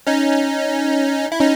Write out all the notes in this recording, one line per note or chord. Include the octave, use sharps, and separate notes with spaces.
C#4 D#4
E4
C#4 D#4